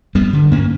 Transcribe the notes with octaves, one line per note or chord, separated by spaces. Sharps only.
G2 G3 B3
D3
G2 A#3 C#4